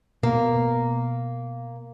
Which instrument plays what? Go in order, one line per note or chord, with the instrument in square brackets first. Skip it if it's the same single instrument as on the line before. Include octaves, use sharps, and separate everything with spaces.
[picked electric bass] B2 [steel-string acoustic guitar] A#3